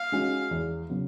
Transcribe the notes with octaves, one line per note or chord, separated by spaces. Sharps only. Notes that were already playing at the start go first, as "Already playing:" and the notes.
Already playing: F5
G#3 C#4 F#4
E2
C#3 F#3 B3